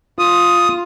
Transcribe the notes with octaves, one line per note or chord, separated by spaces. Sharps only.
F4 D#6